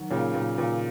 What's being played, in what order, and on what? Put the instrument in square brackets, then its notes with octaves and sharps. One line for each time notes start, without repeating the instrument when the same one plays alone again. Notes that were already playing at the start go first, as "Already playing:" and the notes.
Already playing: [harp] D#3 F#3 C4 D#4
[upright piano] A#2 C#3 [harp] A#3
[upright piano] A#2 [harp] A#3
[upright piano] A#2 [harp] C#3